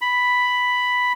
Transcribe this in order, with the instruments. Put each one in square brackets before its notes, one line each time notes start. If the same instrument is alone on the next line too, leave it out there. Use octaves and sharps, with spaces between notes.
[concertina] B5